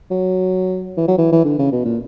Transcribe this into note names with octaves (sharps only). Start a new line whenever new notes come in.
F#3
E3
F#3
E3
E3
D3
C#3
B2
A#2